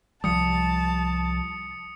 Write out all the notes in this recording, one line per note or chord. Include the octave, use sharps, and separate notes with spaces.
C2 F3 G3 A5 D#6 C#7